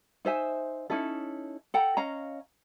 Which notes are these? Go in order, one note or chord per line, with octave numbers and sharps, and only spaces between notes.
D#4 C5 E5 G#5
C#4 D#4 E4 A4
A4 F#5 G5 A#5
C#4 D#5 F5 A#5